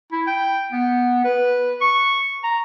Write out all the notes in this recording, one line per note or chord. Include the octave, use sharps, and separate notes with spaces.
E4
G5
B3
B4
C#6
A#5